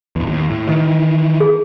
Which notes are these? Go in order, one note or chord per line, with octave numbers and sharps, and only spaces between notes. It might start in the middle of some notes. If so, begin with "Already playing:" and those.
D1 E2
D#2
A2
D#3 E3
G#4